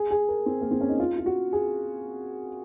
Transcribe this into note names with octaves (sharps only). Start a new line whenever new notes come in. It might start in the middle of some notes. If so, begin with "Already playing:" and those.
Already playing: G#4
G#4
A#4
C4
A#3
C4
C#4
D#4
F4
F4
F#4
G#4